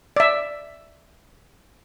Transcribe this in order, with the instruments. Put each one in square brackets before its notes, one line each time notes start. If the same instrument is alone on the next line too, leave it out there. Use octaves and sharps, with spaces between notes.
[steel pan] D5 E5